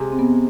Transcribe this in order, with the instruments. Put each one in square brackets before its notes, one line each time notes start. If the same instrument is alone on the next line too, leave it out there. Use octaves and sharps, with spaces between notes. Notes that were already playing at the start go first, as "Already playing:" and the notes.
Already playing: [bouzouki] C3 G#3
[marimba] C4
B3